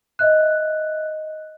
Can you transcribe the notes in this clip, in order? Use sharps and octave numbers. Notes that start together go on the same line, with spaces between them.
D#5 E5 F#6